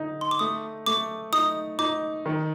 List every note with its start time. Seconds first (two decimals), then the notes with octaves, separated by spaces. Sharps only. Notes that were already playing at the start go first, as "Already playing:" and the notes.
Already playing: D3 D#4
0.21 C6
0.31 D6
0.39 A3 D#6
0.86 A3 D6
1.32 D#4 D#6
1.79 D#4 D6
2.26 D#3